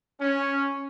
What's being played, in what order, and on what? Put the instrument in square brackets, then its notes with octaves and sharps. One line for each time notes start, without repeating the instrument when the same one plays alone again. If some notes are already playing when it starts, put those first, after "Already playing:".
[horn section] C#4